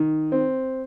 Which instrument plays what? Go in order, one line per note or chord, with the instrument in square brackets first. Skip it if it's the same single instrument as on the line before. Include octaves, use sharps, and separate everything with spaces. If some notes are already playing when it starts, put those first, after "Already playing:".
Already playing: [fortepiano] D#3
C4